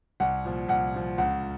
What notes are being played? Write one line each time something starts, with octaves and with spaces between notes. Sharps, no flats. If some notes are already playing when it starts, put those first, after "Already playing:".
C2 F#5
A#2 F3
C2 F#5
A#2 F3
C#2 F#5